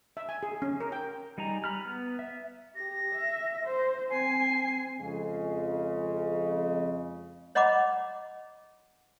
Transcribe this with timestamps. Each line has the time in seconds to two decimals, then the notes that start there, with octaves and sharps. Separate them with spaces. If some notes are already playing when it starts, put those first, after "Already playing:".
0.17 E5
0.29 G#5
0.43 G#4
0.62 C#4
0.80 A#4
0.92 G5
1.38 G3 D#4 G#4 A#5
1.64 A#5 B5 F6
1.85 B3
2.19 E5
2.76 G4 A#6
3.15 E5
3.65 C5
4.11 C4 G#5 C7
5.00 F2 C#3 G#3
7.55 C#5 D#5 F#5 A#5 B5 D6